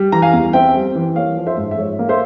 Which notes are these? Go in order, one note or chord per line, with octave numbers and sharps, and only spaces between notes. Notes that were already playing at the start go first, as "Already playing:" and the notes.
Already playing: G3
E3 A#5
F5 G#5
E2
C4 E5 G5
G3
E3
A#3 C#5 F5
F3
C5 E5
G#2
E5
G#2 C#5
A#3
C5 E5